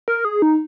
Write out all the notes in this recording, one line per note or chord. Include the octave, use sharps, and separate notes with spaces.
A#4
G#4
D#4